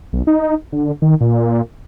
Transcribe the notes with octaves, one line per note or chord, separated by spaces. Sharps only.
B1
D#4
D3
D#3
A#2